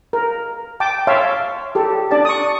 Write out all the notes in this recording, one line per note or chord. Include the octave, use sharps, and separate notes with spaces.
A#4
G5 A5 D6
C#5 E5 F5 A5 C6
G4 A4
D4 D5 A5
C#6 D#6